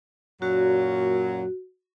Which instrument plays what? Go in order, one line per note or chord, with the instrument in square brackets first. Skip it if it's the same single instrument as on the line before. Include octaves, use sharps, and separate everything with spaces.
[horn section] F#2 A#2 F#3 [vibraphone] F#4